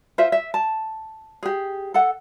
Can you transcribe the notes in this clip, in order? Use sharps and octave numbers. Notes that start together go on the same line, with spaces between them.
F4 C5 E5
E5
A5
G4 G#4
A4 F#5